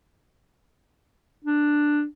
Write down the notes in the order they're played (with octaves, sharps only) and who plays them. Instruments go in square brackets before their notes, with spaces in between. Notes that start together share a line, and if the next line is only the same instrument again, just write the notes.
[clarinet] D4